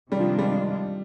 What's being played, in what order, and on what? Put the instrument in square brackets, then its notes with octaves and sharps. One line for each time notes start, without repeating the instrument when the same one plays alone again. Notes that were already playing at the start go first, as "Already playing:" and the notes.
[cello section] C3 D#3 G#3 D4 F4 [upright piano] G3
[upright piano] F3
G3